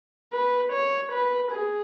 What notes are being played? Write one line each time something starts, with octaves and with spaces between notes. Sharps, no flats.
B4
C#5
B4
G#4